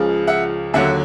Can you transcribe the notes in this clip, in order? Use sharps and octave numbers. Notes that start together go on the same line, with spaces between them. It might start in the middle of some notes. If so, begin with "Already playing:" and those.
Already playing: C#2 C#3 F3 G#3
E5 F#5
D#2 D3 F#3 E5 F#5